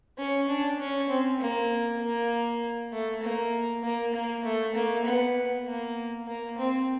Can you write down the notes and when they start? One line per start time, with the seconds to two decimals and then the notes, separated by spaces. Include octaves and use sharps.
0.18 C#4
0.49 D4
0.79 C#4
1.10 C4
1.40 A#3
2.02 A#3
2.92 A3
3.23 A#3
3.83 A#3
4.14 A#3
4.44 A3
4.75 A#3
5.05 B3
5.66 A#3
6.27 A#3
6.58 C4